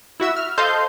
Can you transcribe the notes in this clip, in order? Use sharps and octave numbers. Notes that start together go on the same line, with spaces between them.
E4 F#4 E5 E6
F6
A4 C5 D#5 F5 C6 G6